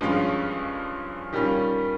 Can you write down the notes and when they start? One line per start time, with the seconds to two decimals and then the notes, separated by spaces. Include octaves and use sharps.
0.01 G2 F3 G#3 C#4 F4
1.33 D#3 G3 C#4 F4